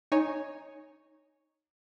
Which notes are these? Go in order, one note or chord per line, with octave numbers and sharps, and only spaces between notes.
D#4 C#5 G#5